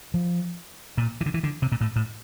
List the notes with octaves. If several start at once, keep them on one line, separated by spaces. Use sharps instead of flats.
F3
A#2
E3
D3
E3
D3
C3
A#2
A2
A2